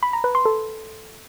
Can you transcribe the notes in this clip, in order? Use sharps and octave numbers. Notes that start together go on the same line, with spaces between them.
B5
A#5
B4
C6
A4